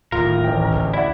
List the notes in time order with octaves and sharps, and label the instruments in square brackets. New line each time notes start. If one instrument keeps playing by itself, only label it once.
[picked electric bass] D1 D#2 [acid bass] A2 [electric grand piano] F4 [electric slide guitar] A#4
[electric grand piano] A1 G5
[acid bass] D2
[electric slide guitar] E4 [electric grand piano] D5 F#5